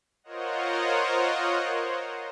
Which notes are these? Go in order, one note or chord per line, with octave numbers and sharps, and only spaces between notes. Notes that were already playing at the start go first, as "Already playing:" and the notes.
F4 A#4 C5 C#5 D#5 F#5